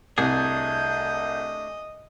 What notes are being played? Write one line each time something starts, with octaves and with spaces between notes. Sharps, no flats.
C2 A3 D4 G#4 D#5 G6